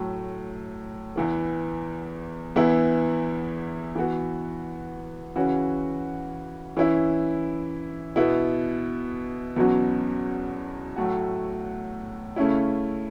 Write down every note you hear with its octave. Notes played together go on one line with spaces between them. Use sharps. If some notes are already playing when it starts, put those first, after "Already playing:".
Already playing: A2 F#3 A3
E2 E3 B3
E2 E3 B3 E4
E3 B3 F#4
C#3 E3 C#4 F#4
E3 C#4 E4
B2 B3 E4
E2 B2 F#3 C#4 F#4
A2 F#3 A3 F#4
C#3 A3 C#4 E4